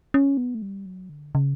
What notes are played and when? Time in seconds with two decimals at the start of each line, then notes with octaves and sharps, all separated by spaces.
0.14 C#4
0.37 B3
0.55 A3
0.62 G3
0.86 F#3
1.09 D3
1.35 C#3